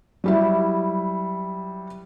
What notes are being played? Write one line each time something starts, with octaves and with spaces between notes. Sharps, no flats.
F#3 G3 E4